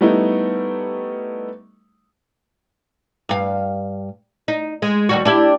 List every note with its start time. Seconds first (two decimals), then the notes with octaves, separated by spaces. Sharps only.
0.01 G3 A3 B3 D#4 E4
3.29 G2 F5
4.48 D#4
4.82 G#3
5.09 D#2 G3 F#4
5.25 D4 E4 G4